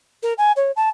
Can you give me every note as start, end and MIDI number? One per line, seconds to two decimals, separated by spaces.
0.23 0.33 70
0.38 0.52 80
0.56 0.71 73
0.76 0.89 81